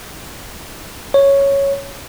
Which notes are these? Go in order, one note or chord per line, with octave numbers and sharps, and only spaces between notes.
C#5